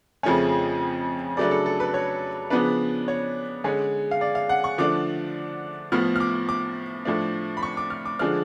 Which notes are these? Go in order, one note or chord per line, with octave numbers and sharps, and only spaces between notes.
F2 C#3 F3 A3 C#4
C#3 F#3 A3 D4 D5
A4
A4
B4
C#5
C#3 F3 B3 D4 B4
C#5
D3 G#3 C#4
F5
D5
F5
F#5
C#6
D3 F3 A3 D4 D6
A2 F3 B3 F6
F6
D6
D6
A2 F3 A3 D4
B5
C#6
D6
F6
D6
D3 F3 G#3 D4 F6